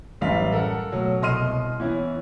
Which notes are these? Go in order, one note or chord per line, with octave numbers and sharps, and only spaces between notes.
A1 F#2 G3 F5 B6
A4 A#4 F#5
B2 F#3 A3
C2 B2 D#5 C6 F6 D#7
E3 B3 C#4 E4